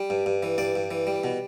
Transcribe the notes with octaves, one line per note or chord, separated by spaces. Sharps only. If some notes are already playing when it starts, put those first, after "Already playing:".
Already playing: G3
G2
G2
E3
G2 D5
G2
E3
G3
B2